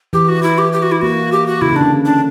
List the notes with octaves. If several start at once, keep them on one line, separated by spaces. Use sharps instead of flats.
E3 G4
F#4
E4
G4
G4
F#4
E4
A#3 F#4
G4
F#4
C#3 E4
C#3
D3 D4
D4